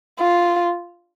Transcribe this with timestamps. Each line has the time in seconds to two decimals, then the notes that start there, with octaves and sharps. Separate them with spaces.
0.20 F4